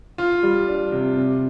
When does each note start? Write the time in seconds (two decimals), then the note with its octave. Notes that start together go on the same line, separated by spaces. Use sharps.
0.18 F4
0.43 G3
0.68 D4
0.92 C3
1.17 C3